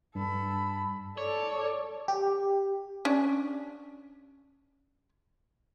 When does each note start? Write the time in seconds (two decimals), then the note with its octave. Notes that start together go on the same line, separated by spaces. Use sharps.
0.15 G2 A4 B5
1.18 A4 C#5 D5
2.08 G4
3.05 C#4 D4